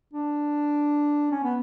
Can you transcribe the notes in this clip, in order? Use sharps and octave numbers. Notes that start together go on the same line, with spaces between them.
D4
C#4
B3